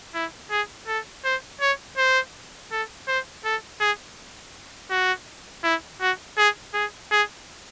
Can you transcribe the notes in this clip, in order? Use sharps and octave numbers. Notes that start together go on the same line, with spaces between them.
E4
G#4
A4
C5
C#5
C5
A4
C5
A4
G#4
F#4
E4
F#4
G#4
G#4
G#4